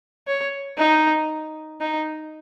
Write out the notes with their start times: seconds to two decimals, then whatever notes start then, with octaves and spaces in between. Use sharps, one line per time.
0.27 C#5
0.78 D#4
1.81 D#4